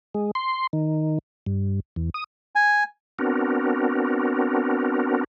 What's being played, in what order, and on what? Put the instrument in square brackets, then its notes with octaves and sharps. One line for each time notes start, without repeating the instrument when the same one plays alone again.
[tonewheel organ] G#3
C6
D#3
G2
E2
D#6
[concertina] G#5
[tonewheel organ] B3 C4 D4 F#4 A#4